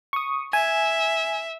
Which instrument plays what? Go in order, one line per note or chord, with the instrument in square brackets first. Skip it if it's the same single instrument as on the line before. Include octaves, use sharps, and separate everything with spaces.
[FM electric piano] C#6 D#6
[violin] E5 [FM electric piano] G#5